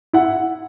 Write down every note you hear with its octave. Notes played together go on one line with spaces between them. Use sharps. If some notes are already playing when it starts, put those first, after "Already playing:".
E4 F#5